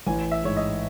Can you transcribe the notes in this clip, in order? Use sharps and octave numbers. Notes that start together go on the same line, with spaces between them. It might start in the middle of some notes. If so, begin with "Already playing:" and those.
A1 G#5
E5
G#2 C#5
D#5